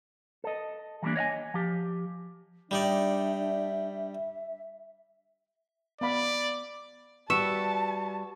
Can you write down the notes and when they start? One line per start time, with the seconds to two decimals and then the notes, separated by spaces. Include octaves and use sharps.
0.44 A4 D#5
1.02 E3 F#3 G3 A#3 D4
1.16 C#5 D#5 F5 G#5
1.54 F3 G4
2.71 G3 D4 D#4 D5 E5
6.01 B3 D5 F5 B5
7.30 G3 F#4 B4 E5 A5 C#6 C#7